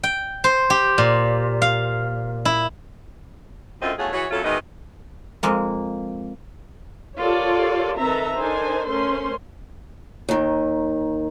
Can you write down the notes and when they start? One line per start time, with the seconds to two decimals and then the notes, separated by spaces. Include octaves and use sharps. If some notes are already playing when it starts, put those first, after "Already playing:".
0.03 G5
0.44 C5
0.70 G4
0.98 A#2
1.62 F5
2.45 E4
3.81 F#2 D3 A3 C4 F4 D#5
3.98 E2 A3 F4 F#4 G#4 C#5
4.13 E3 F#4 G#4 C#5
4.31 F2 F#3 A3 C#4 F4 A4
4.44 B2 D#3 E3 G#3 B4 D#5
5.43 F2 G#3 A#3
7.17 F4 G4 A4 A#4 C#5 D5
7.98 D#3 C4 A4 B4 E5 A#5
8.37 D4 D#4 A4 A#4 C5 G#5
8.88 A3 C#4 A#4 C5 C6
10.29 D#2 D#3